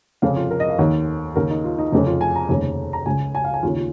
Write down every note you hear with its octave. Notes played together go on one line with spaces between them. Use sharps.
F1 F2 C#3 F5
F4
A#4
D#5
F5
D#2 D#3 C#5
D#2 C#3 A#4
D#4
F4
D#4
F1 F2 C#3 D#4
F4
G#5
A#5
F1 D#2 C#3
A#5
C#2 C#3 G#5
G#5
F5
G#5
D#2 C#3 F4
F4